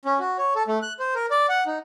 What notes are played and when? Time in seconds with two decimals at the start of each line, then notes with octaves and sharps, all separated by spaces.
0.05 C#4
0.19 F#4
0.38 C#5
0.55 A4
0.68 A3
0.82 F#6
0.99 C5
1.15 A#4
1.31 D5
1.49 F#5
1.67 D#4